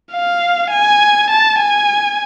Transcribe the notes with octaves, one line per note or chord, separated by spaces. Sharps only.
F5
G#5
A5
G#5